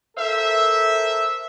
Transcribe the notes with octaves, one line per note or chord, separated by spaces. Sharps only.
A4 A#4 C5 E5